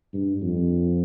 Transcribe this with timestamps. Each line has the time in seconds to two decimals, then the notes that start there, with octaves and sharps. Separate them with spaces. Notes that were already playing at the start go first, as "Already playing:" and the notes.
0.13 G2
0.42 F2